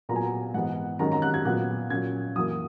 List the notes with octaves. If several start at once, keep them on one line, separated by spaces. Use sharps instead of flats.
A#2 F#3 B3 A#5
G#5
A#5
G#2 E3 B3 F#5
F#2 D#3 G#3 C#4 A#5
A#5
F#6
G#6
A#2 F#3 B3 F#6
A#2 F#3 C#4 G#6
F#2 E3 A#3 D#6